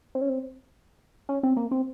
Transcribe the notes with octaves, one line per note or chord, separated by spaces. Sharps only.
C4
C#4
C4
C#4
C4
A#3
C4